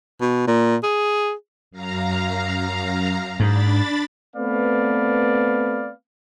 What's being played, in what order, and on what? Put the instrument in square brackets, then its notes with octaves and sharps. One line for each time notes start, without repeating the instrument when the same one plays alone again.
[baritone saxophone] B2
A#2
G#4
[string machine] F#2 F5 A#5
[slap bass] G#2 [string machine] D4 B5 A6
[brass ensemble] A3 B3 C4 B4 D5 F5